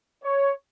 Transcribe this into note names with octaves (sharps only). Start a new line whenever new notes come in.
C#5